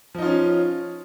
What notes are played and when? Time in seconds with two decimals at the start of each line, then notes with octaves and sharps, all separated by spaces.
0.15 F3
0.18 D#4
0.22 F4
0.26 C#4